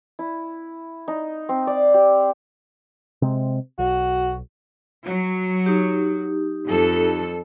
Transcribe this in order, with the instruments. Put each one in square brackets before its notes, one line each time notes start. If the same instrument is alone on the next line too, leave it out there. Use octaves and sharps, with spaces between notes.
[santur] E4
D#4
C4
D5
G4
[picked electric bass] C3 G#3 C4
[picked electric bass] B1 [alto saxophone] F#4
[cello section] F#3
[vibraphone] D#4 G4
[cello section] F2 A4